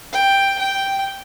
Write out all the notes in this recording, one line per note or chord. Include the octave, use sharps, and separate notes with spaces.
G5
G5